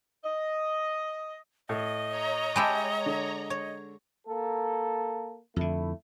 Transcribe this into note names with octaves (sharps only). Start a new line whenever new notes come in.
D#5
A2 D#5
C#5 A#5
G#3 G4 E5 A5 B5
D3
C#5
A#3 A4
F2 D3 A3 E4